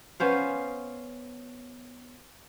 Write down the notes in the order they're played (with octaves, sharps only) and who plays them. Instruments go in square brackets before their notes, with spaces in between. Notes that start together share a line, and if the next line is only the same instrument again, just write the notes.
[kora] B3 C#4 C5 F5